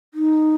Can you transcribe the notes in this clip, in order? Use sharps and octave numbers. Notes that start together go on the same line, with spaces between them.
D#4